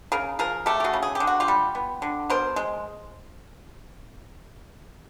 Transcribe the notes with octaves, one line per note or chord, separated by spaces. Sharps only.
C#3 G#4 A#4
F3 G#4 A#4
A3 G4 A4
G4
F#4 G#4
C#3
G#4
G4
D3
F#4
F4 G4
G3
B3
D3
B2 A#4 C5
G#3